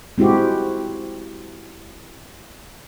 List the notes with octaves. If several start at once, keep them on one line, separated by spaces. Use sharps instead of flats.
G#3 C4 E4 F#4 G4